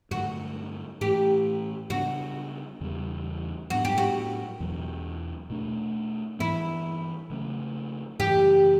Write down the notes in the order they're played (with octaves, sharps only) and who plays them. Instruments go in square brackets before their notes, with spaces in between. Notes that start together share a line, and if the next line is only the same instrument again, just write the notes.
[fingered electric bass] G2 D3 F#3 A3 [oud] F#4
[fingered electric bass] A2 E3 A3 [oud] G4
[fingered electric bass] C#3 G3 B3 D4 [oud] F#4
[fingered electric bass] E2 C#3 E3 G3
[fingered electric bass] A2 F#3 B3 D4 [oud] F#4
[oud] G4
F#4
[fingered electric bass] E2 B2 F#3
B2 A3 D4
[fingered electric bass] G2 E3 B3 [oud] E4
[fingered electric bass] C#3 F#3 A3 C#4
[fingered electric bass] F#2 C#3 E3 A3 [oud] G4